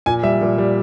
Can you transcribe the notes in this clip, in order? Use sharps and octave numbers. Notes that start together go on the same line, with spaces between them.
A#2 G#5
G3 E5
A#2
G3